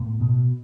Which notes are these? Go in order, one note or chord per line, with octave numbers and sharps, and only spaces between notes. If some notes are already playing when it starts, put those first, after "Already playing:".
Already playing: A2 B3
B2